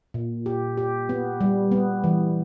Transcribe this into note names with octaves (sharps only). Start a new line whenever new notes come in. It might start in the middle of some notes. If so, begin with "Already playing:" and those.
A#2
G4
G4
B3
G3
B3
E3